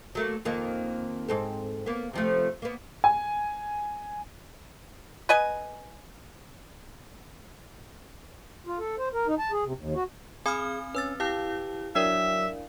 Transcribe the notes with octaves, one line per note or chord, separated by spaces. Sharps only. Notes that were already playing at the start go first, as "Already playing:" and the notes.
F#3 A3 A#3
F2 D#3 A#3
G#2 C4 A4
A#3 B3
C3 F3 A3
A#3 B3
G#5
B4 D#5 G#5
F4
A4
C5
A#4
D#4
A5
G#4
C3
D#2
F#4
C4 G#4 G#5 B5 D#6 F6
C#4 B4 E6 A6
E4 G4 F5
F#3 D4 A#4 D5 E5